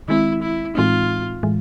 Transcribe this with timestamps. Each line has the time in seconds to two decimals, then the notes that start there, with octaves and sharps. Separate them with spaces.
0.08 D#3 G#3 C4 E4
0.42 E4
0.75 A2 E3 G#3 C4 D#4 F4
1.43 A2 E3 G#3